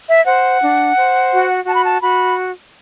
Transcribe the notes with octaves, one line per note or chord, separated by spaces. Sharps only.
E5
C5 F#5
D4
C5
F#4
F#4 A5
B5
A5
F#4 B5